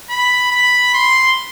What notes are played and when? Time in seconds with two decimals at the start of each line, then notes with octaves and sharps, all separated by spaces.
0.10 B5
0.52 B5
0.94 C6